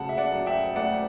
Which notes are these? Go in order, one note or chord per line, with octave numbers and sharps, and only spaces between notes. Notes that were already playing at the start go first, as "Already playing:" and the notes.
Already playing: C#3 F#3 A3 F#5 A5
E5
D5 F#5
F#2
E5 G5
A3 D5 F#5